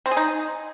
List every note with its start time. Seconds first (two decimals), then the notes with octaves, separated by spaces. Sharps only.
0.06 C4
0.11 G#4
0.17 D#4